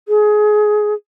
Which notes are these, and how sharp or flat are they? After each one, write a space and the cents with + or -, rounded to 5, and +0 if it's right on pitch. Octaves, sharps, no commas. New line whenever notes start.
G#4 +20